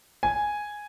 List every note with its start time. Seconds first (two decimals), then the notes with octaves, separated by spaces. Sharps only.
0.23 G#5